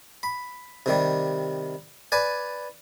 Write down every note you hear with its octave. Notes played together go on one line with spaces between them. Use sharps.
B5
C3 D#3 G3
B4 D5 G#5